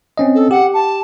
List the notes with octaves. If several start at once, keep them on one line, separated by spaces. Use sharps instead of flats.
C4 C#4 D#5
A4
G4 F#5
A5